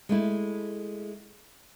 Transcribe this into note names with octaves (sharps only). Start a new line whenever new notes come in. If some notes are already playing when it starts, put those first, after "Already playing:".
G#3 A3 E4